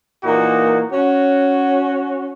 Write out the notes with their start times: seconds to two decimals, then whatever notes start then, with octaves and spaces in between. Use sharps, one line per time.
0.24 A#2 E3 A#3 D#4 F#4
0.93 C#4 F#4